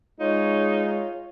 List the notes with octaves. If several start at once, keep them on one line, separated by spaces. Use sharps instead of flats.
G#3 D#4 F4 C#5